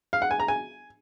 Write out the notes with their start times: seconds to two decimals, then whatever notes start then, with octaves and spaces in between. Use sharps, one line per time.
0.13 F5
0.22 F#5
0.31 G#5
0.40 A#5
0.48 G#5